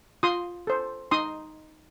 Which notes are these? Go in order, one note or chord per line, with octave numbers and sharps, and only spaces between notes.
F4 C6 D#6
A4 C5
D#4 C6 D#6